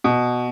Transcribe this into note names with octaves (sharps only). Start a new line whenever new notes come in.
B2